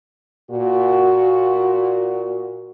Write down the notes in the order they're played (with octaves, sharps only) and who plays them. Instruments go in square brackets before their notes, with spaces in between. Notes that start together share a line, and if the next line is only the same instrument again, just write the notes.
[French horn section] A#2 F#4